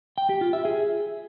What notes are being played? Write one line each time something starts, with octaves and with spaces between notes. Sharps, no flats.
G5
G4
F4
E5
G#4